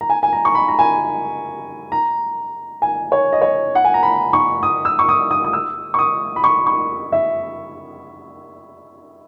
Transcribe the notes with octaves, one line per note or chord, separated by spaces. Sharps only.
A#5
G#5
G#5
A#5
C#6
B5
A#5
G#5
A#5
G#5
C#5
D#5
C#5
F#5
G#5
A#5
B5
C#6
D#6
E6
C#6
D#6
D#6
D#6
E6
C#6
D#6
B5
C#6
C#6
E5